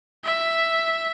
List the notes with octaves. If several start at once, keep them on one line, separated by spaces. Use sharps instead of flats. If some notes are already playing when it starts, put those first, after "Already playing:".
E5